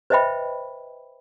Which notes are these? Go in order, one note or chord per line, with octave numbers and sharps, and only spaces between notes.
B4 C5 D#5 E5 G5 B5